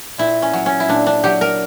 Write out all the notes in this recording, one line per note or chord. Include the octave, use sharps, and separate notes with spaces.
A#2 E4
C#4
F#3
C#4
E4
A#2 D4
D4
F#3 G4
A#4